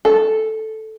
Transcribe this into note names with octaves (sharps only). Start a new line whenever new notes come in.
A4